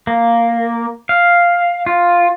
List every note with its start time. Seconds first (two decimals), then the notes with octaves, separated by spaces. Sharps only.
0.07 A#3
1.09 F5
1.86 F4